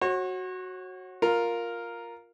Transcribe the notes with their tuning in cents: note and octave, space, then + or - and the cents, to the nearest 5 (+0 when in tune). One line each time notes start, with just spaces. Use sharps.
F#4 +0 C#5 -40
F4 +5 A#4 +0